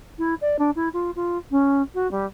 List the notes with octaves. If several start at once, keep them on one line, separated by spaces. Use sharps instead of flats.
E4
D5
D4
E4
F4
F4
C#4
F#4
G3